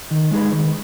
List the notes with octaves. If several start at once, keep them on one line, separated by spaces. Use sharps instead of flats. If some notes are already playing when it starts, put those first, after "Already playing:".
D#3
G#3 D#4 G#4 B4
D#3